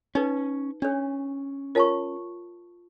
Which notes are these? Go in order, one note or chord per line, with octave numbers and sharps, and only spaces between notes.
C#4 D#4 B4
C#4 D4 C#5
F4 A#4 C#5 A5 C#6